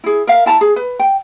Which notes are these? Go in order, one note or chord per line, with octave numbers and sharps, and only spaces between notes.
E4 G#4
A#4 E5 F5
E4 A5 A#5
G#4
B4
G5